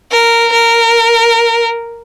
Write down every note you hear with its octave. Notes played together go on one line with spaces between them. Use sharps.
A#4
A#4